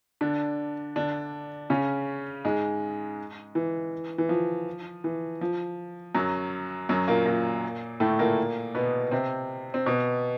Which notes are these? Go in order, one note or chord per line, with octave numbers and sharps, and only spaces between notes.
D3 D4
D3 D4
C#3 C#4
G#2 G#3
E3
E3
F3
E3
F3
F#2 F#3
F#2 F#3
A#2 A#3
A#2 A#3
A2 A3
A#2 A#3
B2 B3
C3 C4
C4
B2 B3